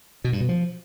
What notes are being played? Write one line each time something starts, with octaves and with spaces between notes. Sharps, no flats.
B2
G2
B2
F3